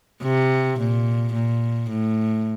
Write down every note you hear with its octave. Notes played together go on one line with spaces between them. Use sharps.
C3
A#2
A#2
A2